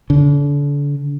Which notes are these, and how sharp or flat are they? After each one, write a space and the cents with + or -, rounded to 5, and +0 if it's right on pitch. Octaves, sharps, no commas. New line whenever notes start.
D3 -35